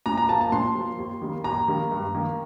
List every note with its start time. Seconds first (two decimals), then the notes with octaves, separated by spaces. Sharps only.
0.06 A#2 A#5
0.17 A#5
0.29 F3 A#3 A5
0.41 A5
0.52 A#2 C6
0.75 F3 A#3
0.99 D#2
1.22 D#3 G3 A#3
1.44 D#2 A#5
1.68 D#3 G3 A#3
1.91 G2
2.15 D#3 A#3